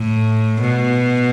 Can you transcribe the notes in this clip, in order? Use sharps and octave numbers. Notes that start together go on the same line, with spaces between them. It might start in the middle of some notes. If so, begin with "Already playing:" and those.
Already playing: A2
B2